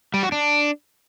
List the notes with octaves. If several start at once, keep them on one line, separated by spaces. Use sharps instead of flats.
G3
F#4
D4